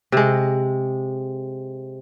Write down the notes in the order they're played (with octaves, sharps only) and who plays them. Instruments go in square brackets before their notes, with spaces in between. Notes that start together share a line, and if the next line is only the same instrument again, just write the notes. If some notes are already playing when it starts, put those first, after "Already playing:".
[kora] C3 G#3